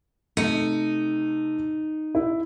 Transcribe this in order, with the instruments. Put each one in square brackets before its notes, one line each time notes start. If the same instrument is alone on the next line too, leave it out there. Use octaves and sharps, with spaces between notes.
[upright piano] C3 A3 C#7 [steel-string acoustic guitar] D#4
[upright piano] E4